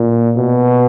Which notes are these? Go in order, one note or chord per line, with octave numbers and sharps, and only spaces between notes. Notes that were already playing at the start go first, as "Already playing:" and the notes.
Already playing: A#2
B2